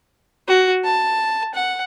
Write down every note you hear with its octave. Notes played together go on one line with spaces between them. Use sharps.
F#4
A5
F#5